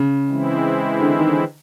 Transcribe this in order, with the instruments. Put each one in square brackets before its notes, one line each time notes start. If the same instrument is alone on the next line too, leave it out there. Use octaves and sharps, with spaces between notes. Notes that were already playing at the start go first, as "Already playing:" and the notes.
Already playing: [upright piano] C#3
[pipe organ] E3 G#3 C4 E4
[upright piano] D3
D#3
D3